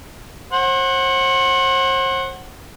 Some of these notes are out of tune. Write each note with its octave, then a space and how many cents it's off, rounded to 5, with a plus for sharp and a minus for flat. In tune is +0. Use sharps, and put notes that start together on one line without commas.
C5 +40 F#5 +0